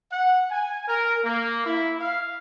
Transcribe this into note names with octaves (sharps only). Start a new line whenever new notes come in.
F#5
G#5
A#4
A#3
E4
F5